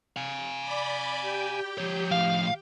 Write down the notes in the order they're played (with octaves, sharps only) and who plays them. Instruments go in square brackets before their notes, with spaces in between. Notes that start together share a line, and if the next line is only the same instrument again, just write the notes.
[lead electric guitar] F5 G#5
[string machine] D5 B5 D6
G4 G5
[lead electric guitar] F3 C#5
[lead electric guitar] A2 F3 [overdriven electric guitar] F5